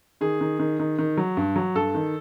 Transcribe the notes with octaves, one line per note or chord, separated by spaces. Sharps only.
D#3 G#4
D#3
D#3
D#3
D#3
F#3
G2
F#3
G2 A4
D#3